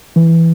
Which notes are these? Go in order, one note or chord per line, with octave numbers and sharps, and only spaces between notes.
E3